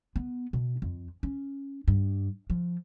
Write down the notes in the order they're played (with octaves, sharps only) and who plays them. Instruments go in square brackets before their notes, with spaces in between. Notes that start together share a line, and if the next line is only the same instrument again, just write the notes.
[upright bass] B3
B2
F2
C#4
G2
F3